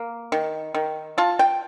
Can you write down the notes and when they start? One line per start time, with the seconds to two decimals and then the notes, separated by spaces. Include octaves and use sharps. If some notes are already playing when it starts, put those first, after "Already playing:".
Already playing: A#3
0.32 D#3
0.74 D#3
1.18 F4 A5
1.39 G5